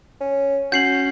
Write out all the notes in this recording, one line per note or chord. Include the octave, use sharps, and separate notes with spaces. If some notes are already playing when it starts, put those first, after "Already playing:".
C#4
C#4 F#4 G6 C7 F#7